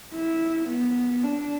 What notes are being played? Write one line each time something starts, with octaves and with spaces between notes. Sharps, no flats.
E4
B3
D4